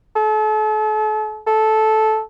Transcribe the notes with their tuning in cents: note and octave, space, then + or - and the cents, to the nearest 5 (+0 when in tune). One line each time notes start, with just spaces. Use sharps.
A4 -40
A4 -10